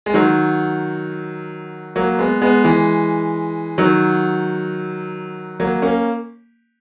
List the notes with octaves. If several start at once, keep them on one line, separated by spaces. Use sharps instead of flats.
G#3
D#3 F#3
F#3 A#3
G#3 B3
G#3 B3
E3 G#3
D#3 F#3
F#3 A#3
A#3 C#4